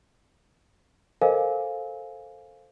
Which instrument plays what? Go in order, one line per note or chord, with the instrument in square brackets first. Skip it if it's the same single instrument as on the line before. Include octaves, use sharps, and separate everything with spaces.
[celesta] A4 A#4 C5 D#5 F5 G#5